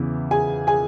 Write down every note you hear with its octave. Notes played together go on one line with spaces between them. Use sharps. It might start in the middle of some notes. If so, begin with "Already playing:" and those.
Already playing: E2 C#3 E3 E4
G#4 G#5
G#4 G#5